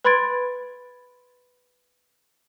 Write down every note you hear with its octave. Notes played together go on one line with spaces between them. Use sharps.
B4 B5 C6 G#6 A6 D7